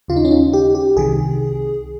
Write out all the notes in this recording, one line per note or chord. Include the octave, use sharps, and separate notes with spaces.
D#2 C#3 F4
D#4
C#4
D#4
G4
G4
C2 C3 D#3 G#4